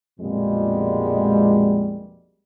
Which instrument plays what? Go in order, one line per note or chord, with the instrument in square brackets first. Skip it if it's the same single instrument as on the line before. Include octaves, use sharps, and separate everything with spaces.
[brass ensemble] A#1 F2 B2 G3 G#3